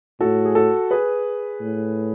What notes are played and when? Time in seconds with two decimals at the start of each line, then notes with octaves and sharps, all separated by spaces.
0.20 A2 F#4 A4
0.45 G#4
0.55 F#4 A4
0.91 G#4 B4
1.60 A2